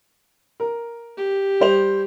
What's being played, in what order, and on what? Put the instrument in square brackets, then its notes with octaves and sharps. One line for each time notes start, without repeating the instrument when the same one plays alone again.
[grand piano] A#4
[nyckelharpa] G4
[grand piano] G3 C5 F7